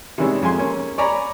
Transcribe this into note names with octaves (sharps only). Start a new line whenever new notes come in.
C3 D#3 E3 G3 G#3 C#4
F2 G#3 G#5 C6
A#3 C#4
C#5 D5 G#5 A#5 B5